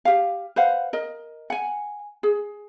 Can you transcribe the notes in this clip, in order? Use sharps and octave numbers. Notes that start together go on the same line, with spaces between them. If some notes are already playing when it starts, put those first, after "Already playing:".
G4 F5
B4 C5 F5 F#5
A#4 D#5
F#5 G#5
G#4